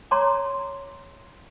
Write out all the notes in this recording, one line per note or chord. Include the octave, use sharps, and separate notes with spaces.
C#5 D5 A5 A#5 C6 D6